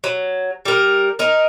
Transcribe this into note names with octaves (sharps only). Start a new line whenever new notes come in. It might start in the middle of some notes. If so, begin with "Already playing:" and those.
F#3
G3 A#4
D#4 A#4